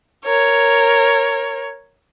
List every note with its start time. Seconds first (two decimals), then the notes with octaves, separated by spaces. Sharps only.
0.25 A#4 C#5